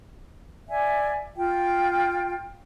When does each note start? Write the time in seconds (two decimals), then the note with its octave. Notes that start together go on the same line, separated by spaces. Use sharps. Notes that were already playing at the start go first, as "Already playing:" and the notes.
0.68 D5 E5 G#5
1.36 F4 G5